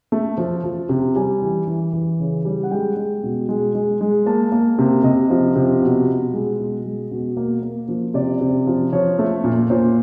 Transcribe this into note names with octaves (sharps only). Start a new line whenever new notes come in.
A3
F3
F3
C3
G3 G#5
E3
E3
E3
C#3
G3
F#5
G#3 G5
G#3
B2
G#3
G#3
G#3
A#3 A5
A#3
C3
C3 D#5
F3
C3
B2
B2
G#3
B2
G#3
B2
A#3
A#3
F3
C3 D5
C3
F3
F3 C#5
A3
A#2
A#2 C5